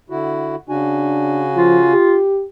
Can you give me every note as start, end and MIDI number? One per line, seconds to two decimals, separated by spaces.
0.10 0.56 50
0.10 0.56 64
0.10 0.56 66
0.69 1.93 49
0.69 1.44 62
0.69 1.93 66
0.69 1.93 80
1.56 1.78 53
1.56 2.20 65
1.93 2.45 67